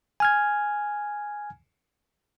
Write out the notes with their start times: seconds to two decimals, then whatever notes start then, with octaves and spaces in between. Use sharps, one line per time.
0.20 G#5 F6 G#6